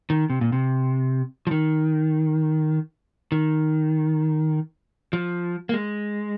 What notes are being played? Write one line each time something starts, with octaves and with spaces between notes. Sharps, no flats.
D#3
C3
A#2
C3
F3
D#3
D#3
F3
A#3
G#3